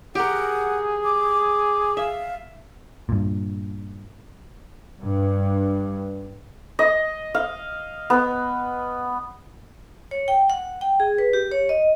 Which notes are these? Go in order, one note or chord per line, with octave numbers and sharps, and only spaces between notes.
G4 G#4 A#4 F#5
D6
E5 F5
G2 A#2
G2
D#5
F5
B3
C#5
G5
F#5
G5
G#4
B4
G4
C#5
D#5